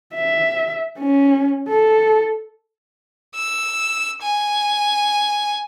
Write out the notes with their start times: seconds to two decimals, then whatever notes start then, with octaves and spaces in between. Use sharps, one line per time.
0.15 E5
0.99 C#4
1.69 A4
3.36 E6
4.22 G#5